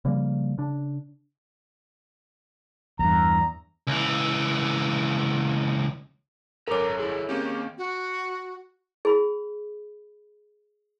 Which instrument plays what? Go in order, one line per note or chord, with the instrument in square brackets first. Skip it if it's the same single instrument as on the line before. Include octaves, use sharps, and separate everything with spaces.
[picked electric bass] C#3 F3 G3 A#3
C#3 D4
[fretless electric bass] E2 G2 [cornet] A#5
[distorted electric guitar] C#2 E3
[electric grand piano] G#1 F#2 [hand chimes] A4 C#5 [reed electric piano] A#4 D6 [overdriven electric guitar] E5 A#5
[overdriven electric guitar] D#3 E4 [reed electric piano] G#4
[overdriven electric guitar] D#2 [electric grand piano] A#3 C#4 G4 [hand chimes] C4
[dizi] F#4
[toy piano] G#4 B5